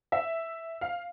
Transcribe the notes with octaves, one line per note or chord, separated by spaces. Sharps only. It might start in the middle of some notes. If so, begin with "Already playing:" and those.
E5
F5